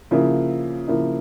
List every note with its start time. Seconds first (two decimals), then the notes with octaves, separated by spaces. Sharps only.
0.11 C#3 F3 A#3 E4
0.88 C#3 F3 A#3 E4